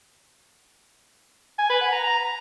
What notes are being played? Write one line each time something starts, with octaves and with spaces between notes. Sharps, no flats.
G#5
B4
F#5
A#5
A#5